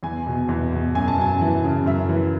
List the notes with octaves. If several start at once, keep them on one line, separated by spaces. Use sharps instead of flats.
E2 G#5
B2
E2
B2
F#2 G#5
A5
F#2 G#5
E3
C#3
F#2 E5
E3